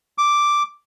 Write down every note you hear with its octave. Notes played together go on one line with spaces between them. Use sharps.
D6